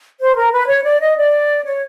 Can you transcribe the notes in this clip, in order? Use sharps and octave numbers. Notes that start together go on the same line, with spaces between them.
C5
A#4
B4
C#5
D5
D#5
D5
C#5